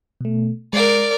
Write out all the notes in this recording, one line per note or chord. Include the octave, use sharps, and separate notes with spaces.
B2 A3
G#3 A#4 D5 C7